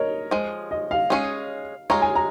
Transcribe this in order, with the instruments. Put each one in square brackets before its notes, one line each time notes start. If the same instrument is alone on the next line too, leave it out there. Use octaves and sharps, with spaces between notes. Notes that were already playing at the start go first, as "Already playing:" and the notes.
Already playing: [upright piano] A#4 C#5 D#5
[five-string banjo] F3 G#3
[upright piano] D#5
F5
[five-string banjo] G#3 C#4 G#4 C#5
[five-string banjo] G#3 F4 C#5 [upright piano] A#5
[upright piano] G#5
A#5